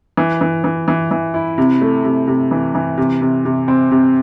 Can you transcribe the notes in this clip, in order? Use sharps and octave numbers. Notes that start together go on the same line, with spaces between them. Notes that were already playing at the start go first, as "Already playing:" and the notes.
E3
E3
E3
E3
E3
E4
C3
A3
C3
C3
E3
E3
C3
C3
C3
C4
C3